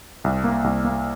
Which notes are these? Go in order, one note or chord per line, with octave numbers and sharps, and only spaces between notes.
C2
A#3
C2
A#3